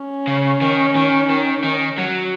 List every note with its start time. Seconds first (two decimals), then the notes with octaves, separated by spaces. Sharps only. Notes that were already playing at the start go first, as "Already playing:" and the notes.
Already playing: C#4
0.27 C#3
0.61 D#3
0.95 D#3
1.30 D#3
1.64 D#3
1.98 F#3